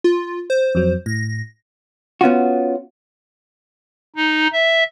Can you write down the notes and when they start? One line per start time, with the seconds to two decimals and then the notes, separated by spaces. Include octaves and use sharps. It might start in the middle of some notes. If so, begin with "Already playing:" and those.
0.04 F4
0.50 C5
0.75 F2 F#3
1.06 A2 A#6
2.21 B3 C#4 F4 F#4
4.16 D#4
4.53 E5